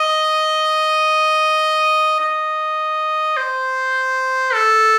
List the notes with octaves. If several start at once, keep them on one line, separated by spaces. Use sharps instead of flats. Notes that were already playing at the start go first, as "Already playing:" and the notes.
Already playing: D#5
D#5
C5
A4